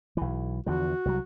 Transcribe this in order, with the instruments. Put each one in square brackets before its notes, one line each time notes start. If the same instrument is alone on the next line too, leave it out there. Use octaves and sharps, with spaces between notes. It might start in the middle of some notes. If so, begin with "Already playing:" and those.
[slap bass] B1 E3
[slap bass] E2 D3 F3 [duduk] F#4
[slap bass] C2 F#3